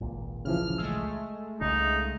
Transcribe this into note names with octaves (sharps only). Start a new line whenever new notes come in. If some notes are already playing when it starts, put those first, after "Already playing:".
G#1 C#2 A#2
C#3 E3 F3 F6
G#3 A3 E6
C2 C#3 C#4 D#4